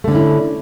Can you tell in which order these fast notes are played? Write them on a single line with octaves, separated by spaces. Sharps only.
A3 D3 C#4 E4